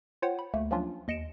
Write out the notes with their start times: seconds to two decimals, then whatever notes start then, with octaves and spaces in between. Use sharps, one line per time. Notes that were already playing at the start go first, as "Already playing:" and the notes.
0.22 F4 C5 C#5 F#5 G5
0.39 B5
0.54 D2 A3 A#3
0.71 F3 F#3 A#3 C#4 D4 F4
1.08 D#2 D#5 C#7 D7 E7